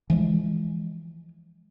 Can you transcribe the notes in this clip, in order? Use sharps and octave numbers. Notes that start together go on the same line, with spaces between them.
E3 F3 G#3